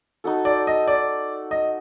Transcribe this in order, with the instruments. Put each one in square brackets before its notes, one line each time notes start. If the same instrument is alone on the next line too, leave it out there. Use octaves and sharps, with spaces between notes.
[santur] D#4 F#4 A4
[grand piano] D5
D#5
D5
D#5